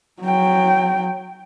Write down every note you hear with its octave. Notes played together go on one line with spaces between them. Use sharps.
F#3 G5